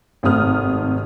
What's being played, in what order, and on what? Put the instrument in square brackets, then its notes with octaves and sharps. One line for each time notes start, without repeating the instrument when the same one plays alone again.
[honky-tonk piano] G#1 C3 A3 D#6 F6